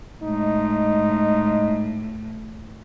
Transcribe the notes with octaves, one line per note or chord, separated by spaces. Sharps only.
A2 G#3 D#4